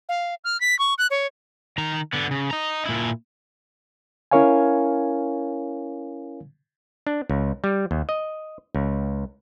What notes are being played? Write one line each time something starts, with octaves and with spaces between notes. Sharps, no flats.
F5
F6
B6
C#6
F#6
C#5
D#3 A#5
D3 B3
C#3
D#5 A#5
A#2 E4
C#4 E4 A#4 C#5 F5 G#5
D4
C#2
G3
D#2
D#5
C#2